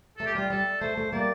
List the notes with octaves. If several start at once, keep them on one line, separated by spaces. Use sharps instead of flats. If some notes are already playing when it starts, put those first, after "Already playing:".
A3 A4
G4
G3 F4
G3 A4
A3 C5
A3
G3 A#3 D5